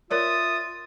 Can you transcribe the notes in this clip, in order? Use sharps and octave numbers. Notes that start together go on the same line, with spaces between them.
F4 A#4 C#5 D5 E5 D#6 A6